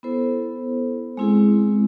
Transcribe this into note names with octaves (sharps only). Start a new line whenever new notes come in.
B3 E4 A4 C5
G#3 C4 E4 G#4